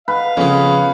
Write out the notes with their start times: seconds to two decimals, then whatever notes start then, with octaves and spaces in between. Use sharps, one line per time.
0.08 B4 F5
0.37 F2 C#3 B3 C#4